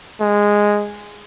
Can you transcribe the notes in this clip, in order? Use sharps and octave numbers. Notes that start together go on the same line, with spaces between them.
G#3